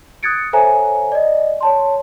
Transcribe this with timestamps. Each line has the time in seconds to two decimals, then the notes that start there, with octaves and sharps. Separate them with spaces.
0.23 D#6 F#6 G#6 A6 C#7 D7
0.53 A4 C5 C#5 E5 G#5 A#5
1.12 D5 D#5
1.61 C#5 A5 C6